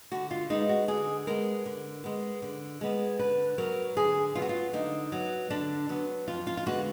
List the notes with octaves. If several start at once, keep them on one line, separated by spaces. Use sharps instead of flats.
D3 F#4
F4
G#3 B3 D#4
F#4
D3 G#4
G#3 B3 A#4
D3
G#3 B3
D3
G#3 B3
D3 B4
F#3 B3 A#4
D3 G#4
F#3 B3 F4
F#4
F4
D3 D#4
F#3 B3
D3 D4
F#3 B3
F2 F4
F4
F4
D3 G#3 B3 F#4